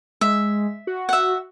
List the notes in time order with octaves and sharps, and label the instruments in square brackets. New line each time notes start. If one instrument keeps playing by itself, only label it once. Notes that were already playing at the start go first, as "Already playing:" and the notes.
[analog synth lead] G#3 [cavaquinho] E5
[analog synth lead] F#4
[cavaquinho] E5 F#5